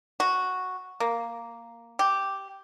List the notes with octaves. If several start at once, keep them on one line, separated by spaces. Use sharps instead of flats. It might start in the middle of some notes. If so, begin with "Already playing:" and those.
F#4
A#3
G4